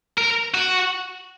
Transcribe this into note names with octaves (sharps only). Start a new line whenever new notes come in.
A#4
F#4